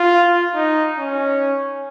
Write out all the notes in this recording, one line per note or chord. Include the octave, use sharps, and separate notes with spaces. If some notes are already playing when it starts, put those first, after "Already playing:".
Already playing: F4
D#4
C#4